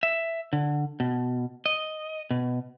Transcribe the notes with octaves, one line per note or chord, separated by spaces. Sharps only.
E5
D3
B2
D#5
B2